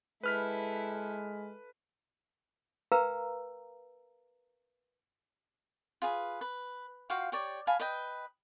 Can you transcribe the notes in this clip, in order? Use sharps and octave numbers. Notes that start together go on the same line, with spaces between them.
G#3 E4 A4 B4 F6 B6
A#4 B4 F5 G5 A#5 E6
F4 G#4 B4
B4
F4 F#4 F5 G5
G4 C#5 D5
F5 G#5 A5 B5
B4 D#5 G5